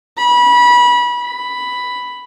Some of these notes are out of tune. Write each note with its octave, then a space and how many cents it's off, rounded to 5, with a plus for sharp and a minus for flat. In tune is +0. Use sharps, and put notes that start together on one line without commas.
B5 -25
B5 +5